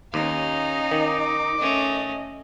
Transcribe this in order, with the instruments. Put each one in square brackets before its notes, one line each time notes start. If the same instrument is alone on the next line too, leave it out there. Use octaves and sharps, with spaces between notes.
[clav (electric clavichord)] D#2 [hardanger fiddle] C#4 F5 [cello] D#4
[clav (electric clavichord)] D#3 [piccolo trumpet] D6
[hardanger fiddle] A3 C#4 [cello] D#5